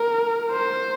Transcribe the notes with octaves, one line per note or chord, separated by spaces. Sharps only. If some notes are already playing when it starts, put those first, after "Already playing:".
Already playing: A#4
C5